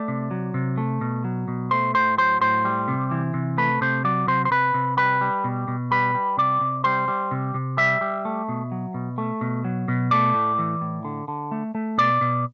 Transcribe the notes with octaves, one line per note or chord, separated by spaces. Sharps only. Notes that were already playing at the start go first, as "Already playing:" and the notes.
Already playing: A3 D5
C3
F#3
C3
A3
B2
F#3
B2
A3 C5
A2 C5
F#3 C5
A2 C5
G3
C3
E3
C3
A3 B4
C3 C5
F#3 D5
C3 C5
C5
C3 B4
C3
G3 B4
G3
B2
B2
G3 B4
G3
C3 D5
C3
G3 C5
G3
C3
C3
G3 E5
G3
A3
B2
F#3
B2
A3
B2
F#3
B2
A3 D5
A2
E3
A2
D3
D3
A3
A3
B2 D5
B2